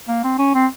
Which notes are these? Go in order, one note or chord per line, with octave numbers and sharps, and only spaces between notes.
A#3
C4
C#4
C4